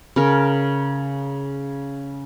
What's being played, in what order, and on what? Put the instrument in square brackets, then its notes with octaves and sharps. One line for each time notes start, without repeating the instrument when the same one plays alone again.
[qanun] C#3 A#4